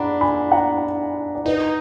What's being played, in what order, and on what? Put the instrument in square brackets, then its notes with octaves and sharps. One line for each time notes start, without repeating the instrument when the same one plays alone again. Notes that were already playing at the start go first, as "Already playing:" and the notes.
Already playing: [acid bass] D4 [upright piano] F#5 A#5 B5
[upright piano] G#5 B5
F#5 A#5
D5
[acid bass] D#4 [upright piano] B4 D#5